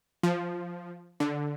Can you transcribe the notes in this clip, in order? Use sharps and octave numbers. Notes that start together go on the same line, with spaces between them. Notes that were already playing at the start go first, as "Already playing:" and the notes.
F3
D3